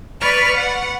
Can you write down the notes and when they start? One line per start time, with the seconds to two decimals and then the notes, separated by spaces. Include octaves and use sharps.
0.20 B4 D5 B5 C#6 F6
0.57 F#5